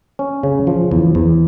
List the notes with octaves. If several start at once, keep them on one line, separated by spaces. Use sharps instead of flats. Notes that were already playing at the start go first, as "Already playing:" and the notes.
C#4
C#3
F3
E2
E2